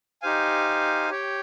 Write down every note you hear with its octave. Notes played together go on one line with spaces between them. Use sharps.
D#4 G4 C5 F5 G#5
G4 C#5 G5